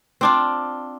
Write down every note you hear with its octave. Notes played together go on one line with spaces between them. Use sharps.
C4 D4 F4